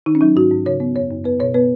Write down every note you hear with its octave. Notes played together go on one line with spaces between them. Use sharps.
D#3 D#4
C#4
F#3 D#4
G#2 F#4
G#2
C#3 C#5
B3
F#2 C#5
F#2
B3 B4
B2 C#5
B3 B4